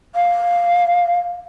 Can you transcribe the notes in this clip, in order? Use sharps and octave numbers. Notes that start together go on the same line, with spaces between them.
F5